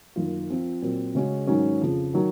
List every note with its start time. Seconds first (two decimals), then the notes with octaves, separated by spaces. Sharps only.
0.16 F#2 D#3 A#3 F4
0.49 F3 C4 F4
0.82 A#2 F#3 C4
1.15 C#3 G#3 C#4 F#4
1.47 G#2 D#3 F#3 C#4
1.81 F2 C#3 F3
2.14 D#3 F#3